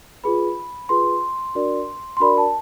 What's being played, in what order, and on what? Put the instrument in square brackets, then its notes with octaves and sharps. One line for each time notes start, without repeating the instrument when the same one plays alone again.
[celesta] F4 G#4 B4 B5
F4 G#4 B4 C6
D4 F#4 A#4 D5
C6
D4 F#4 A#4 D5 B5
A5